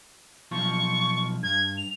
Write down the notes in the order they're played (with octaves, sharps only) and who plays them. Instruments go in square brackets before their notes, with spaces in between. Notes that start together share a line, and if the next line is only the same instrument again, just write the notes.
[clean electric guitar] B1 F3 F4 [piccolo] C#6
[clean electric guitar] G2 [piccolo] G#6
[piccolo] F7